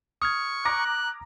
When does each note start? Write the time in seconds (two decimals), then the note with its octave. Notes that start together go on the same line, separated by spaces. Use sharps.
0.22 C#6 D#6 F6 G#6
0.65 A#5 D6 F#6 A#6